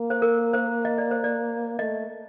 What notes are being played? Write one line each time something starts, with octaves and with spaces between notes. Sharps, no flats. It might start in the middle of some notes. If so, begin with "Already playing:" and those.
Already playing: A#3
C5
A#4
C5
D#5
D5
C5
D5
A3 D#5